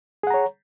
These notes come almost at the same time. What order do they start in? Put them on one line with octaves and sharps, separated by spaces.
G#4 F#5 A#5 C#5